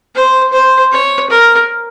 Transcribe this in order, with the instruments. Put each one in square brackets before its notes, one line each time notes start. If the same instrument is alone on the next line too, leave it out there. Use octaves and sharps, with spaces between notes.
[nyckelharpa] C5
C5
C#5
A#4